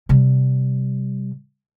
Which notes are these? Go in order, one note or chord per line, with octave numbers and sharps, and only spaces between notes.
C3 G3